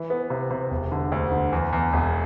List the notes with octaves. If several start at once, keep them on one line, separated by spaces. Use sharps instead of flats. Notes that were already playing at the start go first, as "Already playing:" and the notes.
Already playing: E3
B3
C3
C3
E1
D3
D2
D3
E2
E2
E1